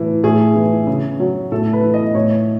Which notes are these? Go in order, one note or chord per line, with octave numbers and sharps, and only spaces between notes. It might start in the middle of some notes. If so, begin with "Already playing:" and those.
Already playing: A2 E3
A2 G#4
E3
C#3
F#3
A2 A4
B4
E3
D#5
A2 C#5